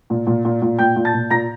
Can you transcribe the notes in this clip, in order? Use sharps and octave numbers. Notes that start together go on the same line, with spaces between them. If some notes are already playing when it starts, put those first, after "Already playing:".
A#2
A#2
A#2
A#2
A#2 G5 G6
A#2
A5 A6
A#2
A#2 A#5 A#6